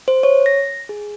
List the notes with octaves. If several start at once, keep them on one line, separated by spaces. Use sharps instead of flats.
C5
C#5
A#6
G#4